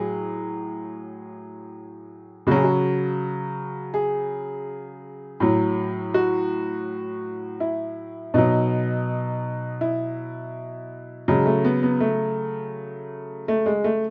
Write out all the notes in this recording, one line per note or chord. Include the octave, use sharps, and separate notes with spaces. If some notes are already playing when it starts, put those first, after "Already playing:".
Already playing: A2 F#3 G#4
C#3 F#3 F#4 G#4
F#4
G#4
A2 F#3
F#4
E4
B2 F#3 D#4
E4
C#3 F#3 G#3
A3
B3
B3
A3
A3
G#3
A3